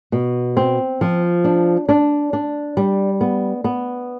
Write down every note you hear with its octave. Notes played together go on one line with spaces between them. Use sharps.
B2
C4
F3
D4
D4
D4
G3
B3
B3